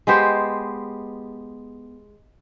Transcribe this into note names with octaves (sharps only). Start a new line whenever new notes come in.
G#3 B3 G4 C5